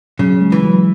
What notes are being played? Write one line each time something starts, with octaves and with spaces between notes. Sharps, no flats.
C#3 F#3
G#3
E3
F#3